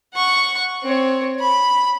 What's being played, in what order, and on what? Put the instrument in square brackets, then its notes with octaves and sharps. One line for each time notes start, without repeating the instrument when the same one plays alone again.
[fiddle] F#5 C#6
C4 C#5
B5